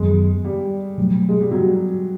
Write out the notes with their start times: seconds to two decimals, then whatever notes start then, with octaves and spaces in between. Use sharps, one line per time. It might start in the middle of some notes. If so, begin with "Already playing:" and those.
Already playing: F#2 D#3 F#3 G#3 B3
0.45 G3
0.98 B2 F#3 A3
1.29 G#3
1.41 G3
1.51 F#3